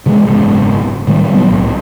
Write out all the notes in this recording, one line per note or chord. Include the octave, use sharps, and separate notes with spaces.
C3 E3 G3 G#3
F#1 C#2 G#2 B2
A2 D#3 G3 A3
B2 F#3 B3
C2 A2